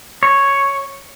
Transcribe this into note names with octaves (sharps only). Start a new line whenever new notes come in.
C#5